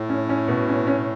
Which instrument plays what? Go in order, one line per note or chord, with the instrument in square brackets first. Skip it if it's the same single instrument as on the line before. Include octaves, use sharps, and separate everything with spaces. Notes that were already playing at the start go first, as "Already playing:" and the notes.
Already playing: [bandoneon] A2
[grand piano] C#4
C#4
B2
C#4
C#4